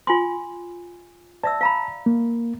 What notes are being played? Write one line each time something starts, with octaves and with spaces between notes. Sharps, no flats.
F4 G#5 C6
D5 E5 A5 E6
F5 A#5 B5
A#3